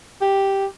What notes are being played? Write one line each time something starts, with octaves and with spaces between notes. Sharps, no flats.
G4